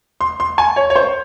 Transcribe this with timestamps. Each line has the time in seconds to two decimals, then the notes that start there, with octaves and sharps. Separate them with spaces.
0.21 C6
0.40 C6
0.58 G#5
0.76 C#5
0.90 C#5
0.96 C5